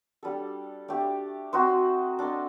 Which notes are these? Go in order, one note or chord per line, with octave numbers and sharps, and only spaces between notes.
G3 D4 A4
A3 D4 G4
C4 D#4 F#4 C5
D4 A4 D#5